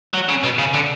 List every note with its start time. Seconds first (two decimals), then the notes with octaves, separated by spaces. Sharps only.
0.14 F#3
0.29 C#3
0.44 B2
0.59 C#3
0.74 D3